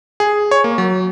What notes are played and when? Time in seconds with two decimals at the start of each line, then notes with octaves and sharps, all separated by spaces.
0.20 G#4
0.51 C#5
0.64 A#3
0.78 F#3